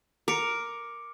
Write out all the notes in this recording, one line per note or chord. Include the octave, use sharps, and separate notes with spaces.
A#4 D6 C#7